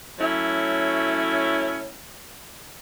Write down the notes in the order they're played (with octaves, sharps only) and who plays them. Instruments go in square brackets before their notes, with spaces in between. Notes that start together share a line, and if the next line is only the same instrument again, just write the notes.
[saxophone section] F#3 A3 C#4 E4